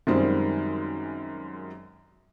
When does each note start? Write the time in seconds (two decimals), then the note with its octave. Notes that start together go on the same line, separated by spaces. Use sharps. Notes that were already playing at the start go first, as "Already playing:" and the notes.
0.07 F#2 D#3 G3 G#3 C4 F4